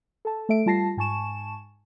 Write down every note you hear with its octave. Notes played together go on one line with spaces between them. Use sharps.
A4 A5
A3 A4 E5 D7
G3 F4 A5 A#6 C7
G#2 G#5 A5 C#6 E7